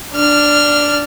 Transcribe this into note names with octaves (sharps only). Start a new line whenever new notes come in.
D4 F6